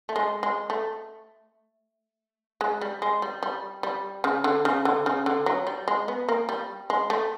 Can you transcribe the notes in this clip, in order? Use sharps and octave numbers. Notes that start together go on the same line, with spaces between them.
A3
G#3
G#3
A3
G#3
G3
G#3
G3
G3
G3
C#3
D3
C#3
D3
C#3
D3
F#3
G3
G#3
B3
A#3
G3
G#3
A3